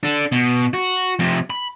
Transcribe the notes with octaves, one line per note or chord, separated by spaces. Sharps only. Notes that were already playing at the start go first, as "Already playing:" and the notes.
D4 A4
B2
F#4
F2 C3
B5